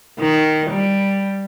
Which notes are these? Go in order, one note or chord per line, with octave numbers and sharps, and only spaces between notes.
D#3
G3